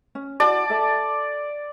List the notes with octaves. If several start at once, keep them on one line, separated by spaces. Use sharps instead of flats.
C#4
E4 F#4 D5 A5
A4 E5 A5